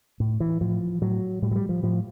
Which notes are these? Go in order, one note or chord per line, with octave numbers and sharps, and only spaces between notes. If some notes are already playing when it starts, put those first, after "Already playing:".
A2
E3
A2 F3
A2 F#3
A2 G3
F#3
G3
F3
A2 F3